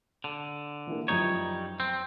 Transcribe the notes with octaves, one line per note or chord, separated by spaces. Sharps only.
D3
E3 A#3
F#2 F3 G3 D#4 C#5
C4